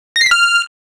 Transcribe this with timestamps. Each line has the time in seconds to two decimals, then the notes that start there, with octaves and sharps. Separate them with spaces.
0.16 A#6
0.21 C7
0.26 B6
0.31 F6